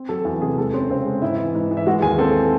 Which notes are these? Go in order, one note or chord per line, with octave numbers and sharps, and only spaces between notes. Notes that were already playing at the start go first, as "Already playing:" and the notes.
Already playing: C4
F#3 A4
E2 A4
C3 G#4
G#3 A4
C4 C#4 C5
C#3 C4 C5
G#3
G#2 E4 E5
E3
G#2
E3
E5
G#3 F#4 F#5
D#2 G#4 G#5
C4 A4 A5